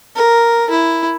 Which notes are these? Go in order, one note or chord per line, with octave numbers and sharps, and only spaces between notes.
A#4
E4